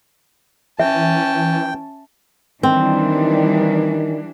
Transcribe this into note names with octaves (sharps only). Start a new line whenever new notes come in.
E3 C#4 E5 G5 A5
D#3 E3 G3 C4 D4